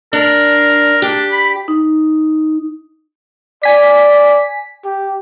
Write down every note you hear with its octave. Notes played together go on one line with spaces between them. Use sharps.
D4 A#4
D4 G4
B5
D#4
D5 G#5 B6
G4